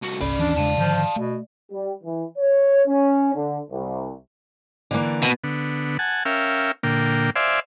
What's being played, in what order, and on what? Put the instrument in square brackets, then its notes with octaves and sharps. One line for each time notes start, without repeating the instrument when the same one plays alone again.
[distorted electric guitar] C2 F#4
[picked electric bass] G1 C2 [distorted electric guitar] C#4 B5 [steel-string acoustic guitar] D5
[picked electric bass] G#1 D#2 E3 [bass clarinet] D4
[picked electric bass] E2 C#3 G#3 [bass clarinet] D4 [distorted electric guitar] F5 A5
[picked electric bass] G#2 D3 D#3 [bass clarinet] F3
[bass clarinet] B2 [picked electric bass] A3
[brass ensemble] G3
E3
C#5
C#4
D3
C2
[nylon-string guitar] D3 E3 A#3
[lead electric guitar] B2
[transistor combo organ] D3 B3
F#5 G#5 A5
C#4 A#4 E5 F5 G5
A#2 D3 A#3 G5
C5 D5 E5 F5 G#5